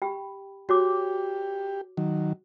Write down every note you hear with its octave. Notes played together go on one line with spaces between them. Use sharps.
G4 G5 B5
F#4 G4 C#5 D6
D#3 F#3